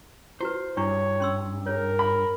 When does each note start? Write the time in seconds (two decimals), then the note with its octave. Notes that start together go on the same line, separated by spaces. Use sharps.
0.41 E4 F#4 B4 C5
0.77 G2 D4 E4 C#5 C#6
1.20 C#4 C6 E6
1.67 G#4 A#4 C#5
1.99 B5